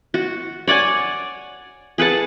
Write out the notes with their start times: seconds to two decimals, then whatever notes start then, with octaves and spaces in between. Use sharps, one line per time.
0.14 F#4
0.67 C#5 D5 F#5 G#5
1.98 G#4 B4 F#5 A5